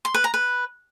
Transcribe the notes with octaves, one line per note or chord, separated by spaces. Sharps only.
C6
B4
A#5
B4